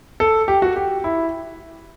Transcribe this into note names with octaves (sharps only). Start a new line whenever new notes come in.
A4
G4
F#4
G4
E4